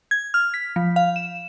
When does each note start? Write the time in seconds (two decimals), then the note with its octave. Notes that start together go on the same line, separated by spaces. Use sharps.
0.11 G#6
0.34 F6
0.54 B6
0.76 F3
0.96 F5
1.16 E7